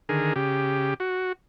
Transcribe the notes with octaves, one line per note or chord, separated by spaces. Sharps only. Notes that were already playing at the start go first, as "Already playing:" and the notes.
D3 D#3 G#4 A#4
C#3 G4
F#4